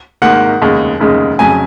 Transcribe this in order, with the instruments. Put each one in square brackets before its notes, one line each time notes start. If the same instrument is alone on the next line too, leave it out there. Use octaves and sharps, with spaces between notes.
[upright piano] G#1 G#2 D#3 A#3 [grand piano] F#5
[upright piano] F1 D#2 C#3 G#3 D#4
F1 D#2 C#3 G#3 D#4
[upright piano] F1 F2 C#3 F#3 [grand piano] G#5